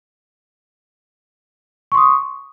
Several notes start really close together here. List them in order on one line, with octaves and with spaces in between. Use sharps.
C#6 C6 D#6